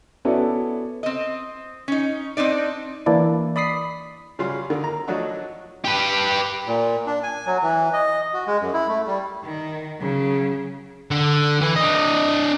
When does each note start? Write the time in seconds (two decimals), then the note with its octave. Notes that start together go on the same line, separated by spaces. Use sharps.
0.25 B3 C#4 E4 F#4 A4 D5
1.03 C4 D#5
1.88 C#4 D#4
2.37 C4 D4 D#4 D5
3.06 E3 A#3 D4 E4 D5
3.56 D5 B5 D#6 B6 C7
4.39 C#3 F#3 G3 F4 C6
4.70 D3 D#3
4.84 A#5
5.08 F3 F#3 A3 D4 D#4 F#4
5.85 G4 B4
6.67 A#2
7.07 D4
7.23 G#5
7.46 F#3
7.63 E3
7.93 D#5
8.34 F#4
8.47 G#3
8.61 F#2
8.73 E4
8.88 A3
9.07 G3
9.44 D#3
9.98 C#3 F#3
11.11 D3
11.61 E3
11.76 D4 D#5